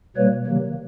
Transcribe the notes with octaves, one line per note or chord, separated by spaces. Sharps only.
B2 G3 A#3 B4 C#5
C3 D#3 F#3 A#3